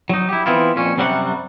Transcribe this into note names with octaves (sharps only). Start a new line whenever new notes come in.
F#3 D#4
E4 G4
E3 F3 B3 C4 E4 F4
F2 A#2 C#4
F#2 C3 F#3 G3 F#4 F#5